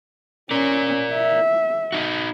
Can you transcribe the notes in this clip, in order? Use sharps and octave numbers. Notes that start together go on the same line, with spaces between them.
C#4 A#4 D5
E5
D#4 F#4